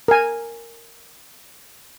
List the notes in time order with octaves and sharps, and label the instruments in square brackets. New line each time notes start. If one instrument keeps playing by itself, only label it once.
[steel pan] A#4 G#5